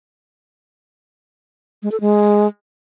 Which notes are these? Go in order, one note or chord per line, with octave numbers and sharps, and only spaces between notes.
G#3
A4
G#3